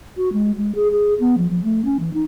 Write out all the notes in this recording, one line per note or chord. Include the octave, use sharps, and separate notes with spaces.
F#4
G#3
G#3
G#4
G#4
B3
F3
F3
A3
C#4
E3
D#4